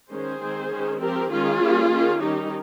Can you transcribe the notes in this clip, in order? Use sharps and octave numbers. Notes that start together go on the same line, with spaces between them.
D#3 G#3 C#4 G#4 C5
D#3 G#3 C4
D#3 G#3 C#4
F3 C4 G4 A#4
D#3 G#3 C#4 F4 G#4
G3 A#3 C#4
D#3 A#3 C#4
D#3 G3 C#4 D#4 G4